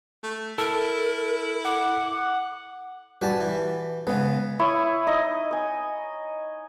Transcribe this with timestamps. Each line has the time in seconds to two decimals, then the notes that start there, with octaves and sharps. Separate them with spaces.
0.23 A3
0.58 E4 A4 A#4
1.65 F#5 D6
3.21 G3 F#4 B4 G#5 A5
3.40 E3
4.07 C#3 G#3 B3
4.59 E4 C#5 C#6 D#6
5.07 D#4 D#5
5.51 D#5 G#5